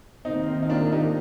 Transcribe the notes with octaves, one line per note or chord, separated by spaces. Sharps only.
C3 D#3 A#3 C4 D#4
C4 D#4
D#4
D4 F4
D#4 G4